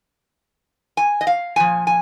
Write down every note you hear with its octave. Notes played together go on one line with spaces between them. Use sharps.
G#5
D#5
F5
A#2 F3 G#5
G#5